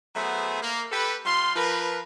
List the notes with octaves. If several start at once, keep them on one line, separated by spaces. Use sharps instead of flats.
F#3 A3 B3 G#4 C5
A#3
G4 A4 B4
G3 F4 C6
F3 A#4 B4